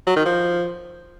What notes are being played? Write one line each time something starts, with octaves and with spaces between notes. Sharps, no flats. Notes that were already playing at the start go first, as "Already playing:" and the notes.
F#3
D#3
F3